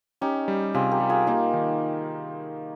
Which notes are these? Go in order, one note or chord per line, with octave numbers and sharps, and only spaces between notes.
C#4 D#4 G4
G3
C3 F4 G#4
G4 A#4
G3
F4 G#4
A#3 D#4 G4
D#3